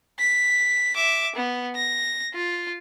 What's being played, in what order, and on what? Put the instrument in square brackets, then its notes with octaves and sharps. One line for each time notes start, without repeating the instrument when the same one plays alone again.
[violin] B6
E5 D6
B3
A#6
F4